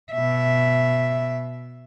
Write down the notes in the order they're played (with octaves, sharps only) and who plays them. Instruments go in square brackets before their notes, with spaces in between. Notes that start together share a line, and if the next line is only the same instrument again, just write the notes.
[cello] B2 E5